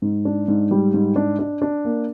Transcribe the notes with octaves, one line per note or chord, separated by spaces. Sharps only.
G#2
D4
G#2
G3
G#2
D4
D4
D4
A#3